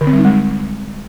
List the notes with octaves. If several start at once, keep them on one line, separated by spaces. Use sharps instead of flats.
D3
C4
G3
D#4
G#3